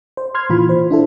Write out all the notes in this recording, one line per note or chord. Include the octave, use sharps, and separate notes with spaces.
C5
C6 F6 G#6
A#2 E3 F4 B5
C5
D4 E4 A4